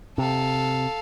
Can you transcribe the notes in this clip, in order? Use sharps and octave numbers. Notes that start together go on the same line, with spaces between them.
C3 A4 F5